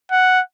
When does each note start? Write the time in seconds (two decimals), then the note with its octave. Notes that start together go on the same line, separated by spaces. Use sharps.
0.11 F#5